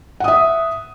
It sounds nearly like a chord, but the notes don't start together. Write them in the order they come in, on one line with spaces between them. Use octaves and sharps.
F#5 D#6 E5